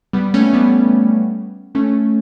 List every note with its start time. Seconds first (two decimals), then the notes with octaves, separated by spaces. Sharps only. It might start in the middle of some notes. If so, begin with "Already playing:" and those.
0.13 G3 B3
0.34 A3 C#4
0.53 G3 B3
1.75 A3 C#4